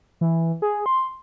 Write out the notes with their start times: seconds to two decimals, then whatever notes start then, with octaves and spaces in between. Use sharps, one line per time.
0.21 E3
0.62 G#4
0.86 C6